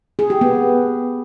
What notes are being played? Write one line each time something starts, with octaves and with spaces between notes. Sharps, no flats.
G#4
G4
B3